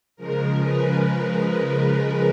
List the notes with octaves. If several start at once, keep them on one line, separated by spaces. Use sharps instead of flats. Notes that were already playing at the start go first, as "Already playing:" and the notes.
C#3 F3 G#3 A#4
B4